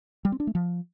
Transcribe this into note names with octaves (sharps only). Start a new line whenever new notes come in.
G3
C4
D4
A3
F3